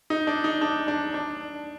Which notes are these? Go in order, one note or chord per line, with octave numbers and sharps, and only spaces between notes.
D#4
D4
D#4
D4
D4
D4